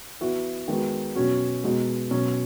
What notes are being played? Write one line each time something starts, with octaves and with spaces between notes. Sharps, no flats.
E3 B3 F#4
D#3 G#3 B3 F#4
B2 F#3 C#4 F#4
B2 G#3 D#4 F#4
B2 F#3 C#4